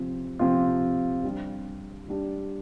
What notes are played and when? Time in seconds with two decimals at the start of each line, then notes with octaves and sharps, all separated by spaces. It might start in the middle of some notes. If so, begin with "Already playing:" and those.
Already playing: C3 F3 C4 F4
0.39 C3 F3 C4 F4
1.24 G3 D4 G4
2.08 G3 D4 G4